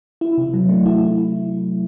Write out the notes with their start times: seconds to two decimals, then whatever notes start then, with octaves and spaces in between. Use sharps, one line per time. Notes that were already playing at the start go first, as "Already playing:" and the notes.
0.21 E4
0.38 C3
0.54 F#3
0.69 A3
0.86 E4